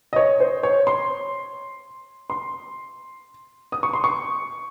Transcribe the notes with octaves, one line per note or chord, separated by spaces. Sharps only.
D#5
C#5
C5
C#5
C6
C6
D#6
C#6
C6
C#6